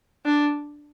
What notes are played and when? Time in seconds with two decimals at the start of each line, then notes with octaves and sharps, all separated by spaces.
0.25 D4